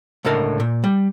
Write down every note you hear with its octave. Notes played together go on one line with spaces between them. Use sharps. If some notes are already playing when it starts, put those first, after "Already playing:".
C#2 A2 D3 A#4 A5
A#2
G3